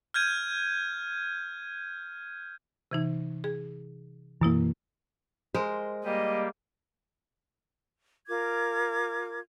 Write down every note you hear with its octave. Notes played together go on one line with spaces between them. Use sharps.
F6 G6 G#6 D#7
C3 E3 D#4
G#4
F#2 B2 E3 A#3 E4
G#3 A#4 C5
G3 A#3 G4 D#5
F4 A#4 D6 G#6